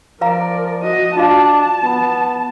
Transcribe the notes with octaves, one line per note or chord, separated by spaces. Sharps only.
F3 A#4 B4 D5 F5 A#5
F#4 D#5
D4 F4 F#4 F5 A5
B3